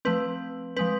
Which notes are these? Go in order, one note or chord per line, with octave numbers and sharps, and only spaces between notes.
F3 A3 C4 B4
F3 G#3 C4 B4